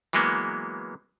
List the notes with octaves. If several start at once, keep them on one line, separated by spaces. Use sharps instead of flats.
E3 F#3 G#3 A#3 B3